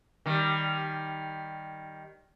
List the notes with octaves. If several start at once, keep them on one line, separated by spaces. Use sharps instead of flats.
D#3 G3